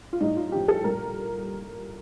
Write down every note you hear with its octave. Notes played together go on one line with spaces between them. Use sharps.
F4
A2 G3 D#4
F4
A2 F3 G4
A4
A#2 G3 A#4